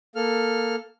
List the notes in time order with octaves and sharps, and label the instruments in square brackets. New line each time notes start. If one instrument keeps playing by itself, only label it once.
[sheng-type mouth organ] A#3 A4 F6